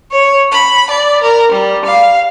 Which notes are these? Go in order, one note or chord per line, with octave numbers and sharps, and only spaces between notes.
C#5
B5
D5
A#4
G3
F5